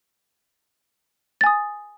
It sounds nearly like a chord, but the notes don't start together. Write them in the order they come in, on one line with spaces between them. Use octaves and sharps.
A6 G#5 D#6